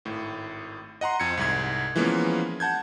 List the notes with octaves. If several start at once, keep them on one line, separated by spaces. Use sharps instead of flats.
G#1 A2
D#5 F#5 A#5 C6
F2 G#6 C#7
C2 G#2 G#6
E3 F3 G#3 A#3 B3 C#4
F#5 A5 G6 G#6